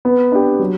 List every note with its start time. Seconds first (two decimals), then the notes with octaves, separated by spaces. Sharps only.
0.05 B3
0.32 D4 G4 B4
0.60 F#3